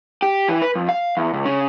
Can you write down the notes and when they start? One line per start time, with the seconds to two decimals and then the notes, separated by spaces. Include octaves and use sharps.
0.22 G4
0.49 E3
0.62 B4
0.75 F2
0.89 F5
1.17 E2
1.33 C#2
1.45 C#3